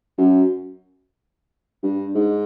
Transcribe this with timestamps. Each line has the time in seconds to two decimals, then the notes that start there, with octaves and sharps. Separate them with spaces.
0.18 F#2
1.83 G2
2.15 G#2